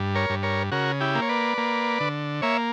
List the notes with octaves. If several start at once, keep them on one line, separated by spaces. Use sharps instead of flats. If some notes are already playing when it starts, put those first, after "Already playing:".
Already playing: G2
A#4 C#5
G2
A#4 C#5
C#3 F#4 A#4
E4 G4
A#3
C#5
B4 D5
A#3
D3
A#3 C#5 E5